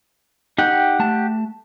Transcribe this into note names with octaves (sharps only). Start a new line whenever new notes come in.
D#4 G4 F#5 G5
A3 A5